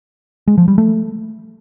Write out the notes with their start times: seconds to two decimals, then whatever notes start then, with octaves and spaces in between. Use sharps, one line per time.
0.48 G#3
0.58 F3
0.68 G3
0.78 A3